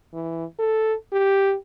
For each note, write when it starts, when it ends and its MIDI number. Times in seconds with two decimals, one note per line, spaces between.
0.14 0.45 52
0.59 0.94 69
1.13 1.55 67